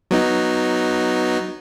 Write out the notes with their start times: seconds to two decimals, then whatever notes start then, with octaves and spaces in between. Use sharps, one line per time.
0.11 F#3 B3 D#4